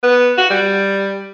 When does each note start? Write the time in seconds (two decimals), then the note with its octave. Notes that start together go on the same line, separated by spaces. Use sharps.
0.03 B3
0.38 F#4
0.50 G3